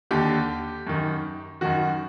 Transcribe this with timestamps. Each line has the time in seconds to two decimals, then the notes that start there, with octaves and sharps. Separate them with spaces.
0.11 D#2 D3 G4
0.87 F#2 D#3
1.61 F#2 D#3 F#4